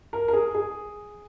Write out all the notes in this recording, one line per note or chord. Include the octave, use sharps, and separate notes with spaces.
A#4
A#4
G#4
G#4